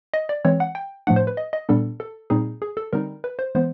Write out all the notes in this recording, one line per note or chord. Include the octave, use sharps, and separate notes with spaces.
D#5
D5
E3 G#3 C4 C#5
F#5
G5
A2 F3 A3 D4 F#5
C5
B4
D#5
D#5
A#2 G3 B3 D4 A4
A4
A#2 G3 C4 D#4 G#4
G#4
A4
D3 G3 C4 D#4 A#4
B4
C5
E3 G#3 B3 C5